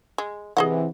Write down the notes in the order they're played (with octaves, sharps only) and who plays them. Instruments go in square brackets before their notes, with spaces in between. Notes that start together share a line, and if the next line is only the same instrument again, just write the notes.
[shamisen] G#3
[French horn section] C3 E3 [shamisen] G#4 D#5 F#5